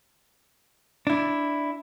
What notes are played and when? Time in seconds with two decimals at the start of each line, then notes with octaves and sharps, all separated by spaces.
1.07 D4 E4